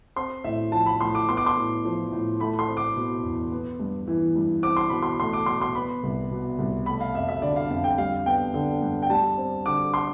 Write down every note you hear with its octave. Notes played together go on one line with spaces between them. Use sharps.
C4 C6
A2 E5
F3 A5
B5
A2 C6
D6
B3 C6
D6
C6
A2
F3
A2
A3 B5
C6
C4
D6
B2
E2
B3
G2
E3
G2
C4 D6
C6
B2 B5
C6
A3 C6
D6
B2 C6
C6
B3 B5
C2
B2
C2
A3 B5
F5
F2 E5
E5
D3 D5
F5
F2 F5
G5
G3 F5
B3 G5
D3
G2
G5
G3 A5
C4
D3 D6
C6